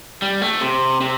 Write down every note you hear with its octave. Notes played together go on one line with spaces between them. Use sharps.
G3
A3
C3
C3